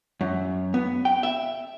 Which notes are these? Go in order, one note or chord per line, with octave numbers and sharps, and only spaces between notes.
F#2
B3
G5
E5